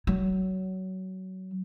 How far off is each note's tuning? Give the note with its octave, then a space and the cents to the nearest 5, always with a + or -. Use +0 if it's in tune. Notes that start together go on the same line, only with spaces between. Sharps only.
F#3 +20